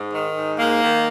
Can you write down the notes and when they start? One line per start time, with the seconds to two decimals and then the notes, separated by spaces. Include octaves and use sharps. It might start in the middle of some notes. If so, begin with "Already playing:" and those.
Already playing: G#2
0.12 D#3
0.35 G#2
0.57 G#2 A#3
0.80 D#3